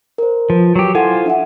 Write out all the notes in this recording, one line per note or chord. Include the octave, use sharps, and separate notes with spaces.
A#4 C5
F3 B4
F#3 G4
E4 F4 A4 C5 F#5 G#5
D4 E5 F#5